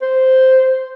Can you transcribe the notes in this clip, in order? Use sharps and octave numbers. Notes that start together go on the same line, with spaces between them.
C5